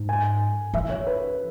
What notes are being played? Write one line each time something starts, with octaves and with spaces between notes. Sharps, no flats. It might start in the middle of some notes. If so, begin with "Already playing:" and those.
Already playing: G#2
G#5
E3 E5
C#5
B4